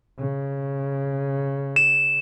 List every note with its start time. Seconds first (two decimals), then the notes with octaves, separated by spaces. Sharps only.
0.20 C#3
1.76 E7